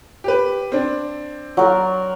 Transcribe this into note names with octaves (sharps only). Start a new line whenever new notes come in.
G4 B4
C4 D4
F#3 A#4